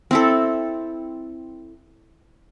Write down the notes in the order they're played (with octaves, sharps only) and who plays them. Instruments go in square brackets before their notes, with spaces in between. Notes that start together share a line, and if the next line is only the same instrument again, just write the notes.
[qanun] C4 E4 A4